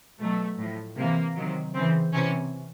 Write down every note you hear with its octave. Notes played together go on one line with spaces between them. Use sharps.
B2 F#3 A3
A2 F3
C3 E3 A#3
C3 D#3 F#3
C#3 E3 C4
C3 E3 C#4